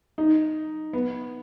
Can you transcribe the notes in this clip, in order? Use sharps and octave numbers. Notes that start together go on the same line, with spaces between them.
D#4
B3